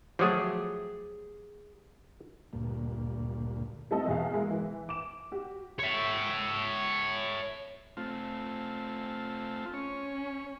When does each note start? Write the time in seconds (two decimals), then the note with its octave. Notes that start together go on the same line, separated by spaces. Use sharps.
0.19 F3 F#3 A3 G4 G#4
2.53 D2 G2 A#2
3.91 G3 A3 C4 F4 A4 D#5
4.07 E2 B2 F#4 G#4 E5 F5
4.33 G#3 A#3 E4
4.51 E3
4.89 D6 E7
5.32 F#4 G4
5.79 C#5 E5
7.97 A3 C4 F4
9.74 C#4 C#5